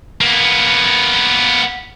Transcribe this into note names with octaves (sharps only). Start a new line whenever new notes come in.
A#3 B3